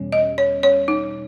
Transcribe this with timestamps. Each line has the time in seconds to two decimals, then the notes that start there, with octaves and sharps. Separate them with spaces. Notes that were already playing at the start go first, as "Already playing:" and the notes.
Already playing: E2 B2 G3 C#4
0.12 D#5
0.38 C#5
0.63 C#5
0.88 D#4